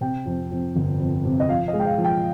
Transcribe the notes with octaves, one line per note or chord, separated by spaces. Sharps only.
C3 G5
F2
F2
G1
F2
C3
D#5
F3 F5
D#5
G#3
G5
F5
F3
G5